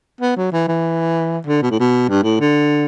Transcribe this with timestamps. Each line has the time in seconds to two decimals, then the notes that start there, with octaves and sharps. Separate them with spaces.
0.21 B3
0.37 F#3
0.52 E3
0.68 E3
1.47 D3
1.62 B2
1.71 A2
1.80 B2
2.09 G2
2.24 A2
2.40 D3